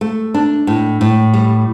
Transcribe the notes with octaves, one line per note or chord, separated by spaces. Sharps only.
A3
D4
A2
A2
G3